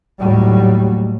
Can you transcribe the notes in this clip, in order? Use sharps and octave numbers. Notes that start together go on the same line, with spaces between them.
D#2 A2 F#3 G3